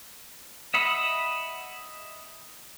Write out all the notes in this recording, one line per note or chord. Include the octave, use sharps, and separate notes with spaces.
D#5 E5 F#5 B5 D#6